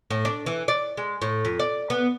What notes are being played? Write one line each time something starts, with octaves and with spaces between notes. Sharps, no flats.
A2
D4
E3
D5
G#3
A2
F2
D5
B3